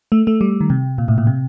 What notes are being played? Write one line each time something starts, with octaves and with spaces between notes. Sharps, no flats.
A3
A3
G3
D#3
C3
A#2
A2
A#2
C3